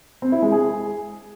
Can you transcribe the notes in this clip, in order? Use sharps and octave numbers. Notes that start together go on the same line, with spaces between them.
C4
E4
G#3
G#4